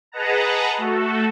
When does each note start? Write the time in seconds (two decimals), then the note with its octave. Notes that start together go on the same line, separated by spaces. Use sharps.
0.12 G#4 B4 D#5 F#5 A5 A#5
0.78 A3 F#4 A4